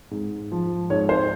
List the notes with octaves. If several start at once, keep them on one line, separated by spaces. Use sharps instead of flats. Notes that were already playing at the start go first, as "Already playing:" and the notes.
G#2
F3
G#2 C#5
C5